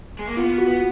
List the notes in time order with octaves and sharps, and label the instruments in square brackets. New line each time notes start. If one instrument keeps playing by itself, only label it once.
[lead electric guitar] G#3
A#3
[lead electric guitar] B3 [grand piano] F4
[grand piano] F#4
[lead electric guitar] B3